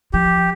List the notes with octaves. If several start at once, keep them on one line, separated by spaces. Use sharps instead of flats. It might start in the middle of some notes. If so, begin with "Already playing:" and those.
F3 G4